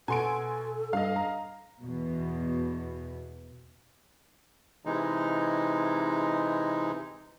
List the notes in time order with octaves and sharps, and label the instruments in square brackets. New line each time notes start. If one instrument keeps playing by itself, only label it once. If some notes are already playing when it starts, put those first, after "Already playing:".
[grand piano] B2 [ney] A4 [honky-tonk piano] G#5 C6 D7
[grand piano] G2 [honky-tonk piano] D#5 F5
[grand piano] A#5
[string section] E2 B2
[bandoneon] C3 E3 G#3 D#4